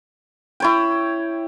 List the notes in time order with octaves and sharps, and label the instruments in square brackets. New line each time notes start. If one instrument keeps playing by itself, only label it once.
[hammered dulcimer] E4 C#5 G5